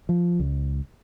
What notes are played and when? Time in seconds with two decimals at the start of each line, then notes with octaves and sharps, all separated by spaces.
0.09 F3
0.40 C#2